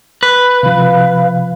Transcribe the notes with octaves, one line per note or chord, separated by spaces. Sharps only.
B4
C3 F3 F5